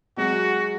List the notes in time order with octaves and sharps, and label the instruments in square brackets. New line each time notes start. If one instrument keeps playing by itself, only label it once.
[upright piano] F#3 G#3 [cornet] F#4